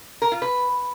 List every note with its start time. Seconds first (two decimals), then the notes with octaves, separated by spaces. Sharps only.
0.22 A#4
0.32 F4
0.42 B4